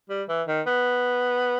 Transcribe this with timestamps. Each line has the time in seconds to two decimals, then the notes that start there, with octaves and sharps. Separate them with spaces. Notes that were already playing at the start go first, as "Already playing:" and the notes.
0.10 G3
0.29 E3
0.48 D#3
0.66 B3